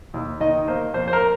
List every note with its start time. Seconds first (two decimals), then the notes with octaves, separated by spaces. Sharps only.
0.14 D#2
0.40 D#3 D#5
0.68 A#3 C5
0.94 F2 C5
1.08 C5
1.13 A#4